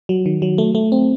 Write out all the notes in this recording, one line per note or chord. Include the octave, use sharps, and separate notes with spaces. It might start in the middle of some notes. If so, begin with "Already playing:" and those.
F#3
D#3
F#3
A3
A3
C4